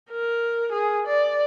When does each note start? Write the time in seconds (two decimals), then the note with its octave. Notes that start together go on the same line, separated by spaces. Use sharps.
0.11 A#4
0.72 G#4
1.08 D5